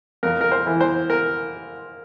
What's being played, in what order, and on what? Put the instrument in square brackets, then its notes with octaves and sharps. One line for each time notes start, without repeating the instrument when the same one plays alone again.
[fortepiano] F2 A#4
A#4
C5
E3
C5
A#4